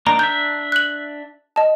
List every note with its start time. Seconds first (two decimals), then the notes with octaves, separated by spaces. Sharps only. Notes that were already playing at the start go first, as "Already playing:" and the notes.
0.07 A#3 D4 D#4 A#5
0.19 D4 E5 G6
0.72 F#6 F#7
1.56 D#5 A5